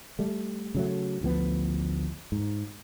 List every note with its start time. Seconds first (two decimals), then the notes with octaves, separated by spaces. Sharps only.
0.19 G3 A3
0.75 C#3 F#3 A3
1.21 A1 D2 F3 B3
2.32 G#2